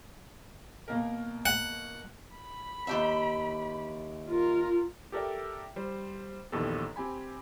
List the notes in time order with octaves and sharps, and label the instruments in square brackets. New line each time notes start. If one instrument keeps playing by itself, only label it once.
[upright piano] B2 A#3 A#4
[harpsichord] F#5
[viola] B5
[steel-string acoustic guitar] D#2 G4 E5
[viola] F4 A#4
[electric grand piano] G4 A4 A#4 D5 E5 G5
G3 C5
A#1 E2 D#3 G4 A4
C4 G4 G#5 B5